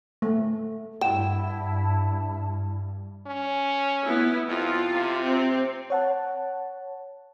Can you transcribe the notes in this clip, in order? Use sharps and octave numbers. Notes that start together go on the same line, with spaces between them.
A3
G2 E4 F#5 G5 A5 E7
C#4
B3 E4
F2 F4
C3
C4
C#5 F#5 A5